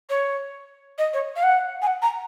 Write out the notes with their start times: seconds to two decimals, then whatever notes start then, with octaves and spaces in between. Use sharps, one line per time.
0.09 C#5
0.98 D#5
1.13 C#5
1.36 F5
1.43 F#5
1.82 G#5
1.87 F#5
2.02 A#5